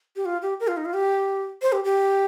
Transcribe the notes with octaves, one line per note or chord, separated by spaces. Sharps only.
G4
F4
G4
A#4
F4
D#4
F4
G4
C5
G4
G4